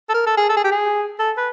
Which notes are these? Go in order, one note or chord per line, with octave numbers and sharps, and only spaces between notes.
A4
A#4
A4
G#4
A4
G#4
G4
G#4
A4
B4